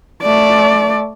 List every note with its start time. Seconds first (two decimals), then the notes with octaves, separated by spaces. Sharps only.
0.23 A3 D5